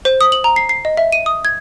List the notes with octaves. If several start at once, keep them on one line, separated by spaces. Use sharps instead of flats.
C5
D#6
F#7
A#5
C7
C7
D#5
E5
D#7
D#6
G#6